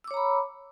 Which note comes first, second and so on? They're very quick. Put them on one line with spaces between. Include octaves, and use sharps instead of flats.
E6 D6 C#5 A#5 B5